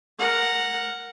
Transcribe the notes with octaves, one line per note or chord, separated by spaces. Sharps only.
A#4 F#5